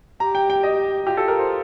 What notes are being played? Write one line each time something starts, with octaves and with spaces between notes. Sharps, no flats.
G4 A#5
G5
G5
D#5
F4 G4
A4
A#4
C5